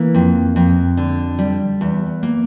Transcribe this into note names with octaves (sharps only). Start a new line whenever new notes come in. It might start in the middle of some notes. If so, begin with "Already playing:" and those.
Already playing: E3 A#3
F2
F2
D3
G3
E2
A#3